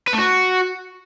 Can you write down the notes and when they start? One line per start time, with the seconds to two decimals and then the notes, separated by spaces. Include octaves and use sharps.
0.07 B4
0.13 A3
0.18 F#4